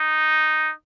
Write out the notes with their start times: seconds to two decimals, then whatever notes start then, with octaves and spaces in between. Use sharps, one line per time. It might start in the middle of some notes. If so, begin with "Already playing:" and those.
Already playing: D#4